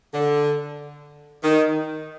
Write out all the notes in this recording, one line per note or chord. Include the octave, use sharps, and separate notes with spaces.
D3
D#3